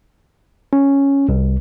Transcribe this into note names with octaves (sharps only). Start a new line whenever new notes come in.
C#4
C2